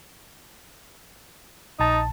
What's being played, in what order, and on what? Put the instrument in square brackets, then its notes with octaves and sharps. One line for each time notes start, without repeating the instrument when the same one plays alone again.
[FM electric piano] A#1 A5 [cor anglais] D#4